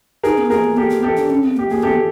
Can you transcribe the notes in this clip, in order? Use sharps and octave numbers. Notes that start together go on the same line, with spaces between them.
D#4 G#4 A#4
B3
A#3 G#4 A#4
B3
A#3 G4 A4
B3
G4 A4
D4
C#4
C4
A#3 G4
A#3 G#4
B3 G4 A4